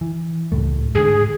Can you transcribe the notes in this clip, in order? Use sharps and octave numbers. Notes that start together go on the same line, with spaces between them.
E3
C#2 A2 A3
G#2 D3 G#4